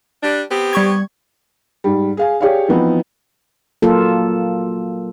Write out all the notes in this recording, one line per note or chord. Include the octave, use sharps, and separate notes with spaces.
G3 D4
B3 C4 G4
G3 C#6 G#6
G#2 G3
G#4 F5 G#5
G4 G#4 C#5 D5 F5
E3 F3 B3 C4 D#4
F#3 A#3 F4 A4